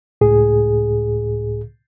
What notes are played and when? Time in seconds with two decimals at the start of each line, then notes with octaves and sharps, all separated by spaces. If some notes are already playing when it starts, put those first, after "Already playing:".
0.21 C#2 A2 G#4